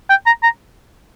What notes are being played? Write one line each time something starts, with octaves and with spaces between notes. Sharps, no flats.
G5
A#5
A#5